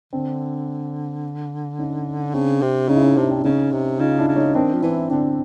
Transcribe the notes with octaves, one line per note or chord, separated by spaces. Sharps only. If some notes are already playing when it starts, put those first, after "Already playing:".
D3 C4 D4
C#4 D#4
C#3 C4 D4
C3
C#3 C#4 D#4
E4
C#4 D#4
C3 C4 D4
C4 D4
C#3 C#4 D#4
C3
C#3 D#4 F4
D4 E4
C#3
C#4 D#4
D#3 C4 D4
F3
E3 D4 E4
D3 C4 D4